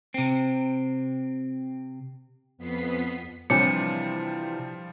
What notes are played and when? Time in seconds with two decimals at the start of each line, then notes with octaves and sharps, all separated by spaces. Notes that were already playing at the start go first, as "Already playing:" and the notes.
0.14 C3 C4
2.58 F2 B3 B6 C7
3.50 C3 E3 F3 G3 D4 C#5 D6 C#7